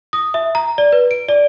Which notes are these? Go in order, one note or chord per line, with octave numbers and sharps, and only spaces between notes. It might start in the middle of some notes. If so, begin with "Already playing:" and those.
D#6
E5
A#5
D5
B4
D7
D5